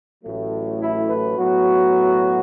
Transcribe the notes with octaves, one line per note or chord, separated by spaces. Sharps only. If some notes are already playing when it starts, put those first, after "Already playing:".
A1 A2 F#3 A3
E4
B4
A2 F#3 B3 F#4